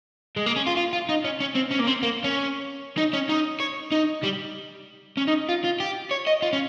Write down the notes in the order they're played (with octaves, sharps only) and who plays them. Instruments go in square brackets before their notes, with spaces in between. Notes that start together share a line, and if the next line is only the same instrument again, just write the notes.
[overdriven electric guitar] G#3
A#3
C#4
F4
F4
F4
D#4
C#4
C#4
C4
C#4
A#3
C4
A#3
C#4
D#4
C#4
D#4
C#5
D#4
G3
C#4
D#4
F4
F4
G4
C#5
D#5
F4
C#4